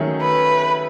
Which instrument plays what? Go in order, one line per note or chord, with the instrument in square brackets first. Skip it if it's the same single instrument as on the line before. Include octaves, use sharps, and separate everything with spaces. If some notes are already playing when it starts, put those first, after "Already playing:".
Already playing: [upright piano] D#3 F#3 A3 C#4 G#4
[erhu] B4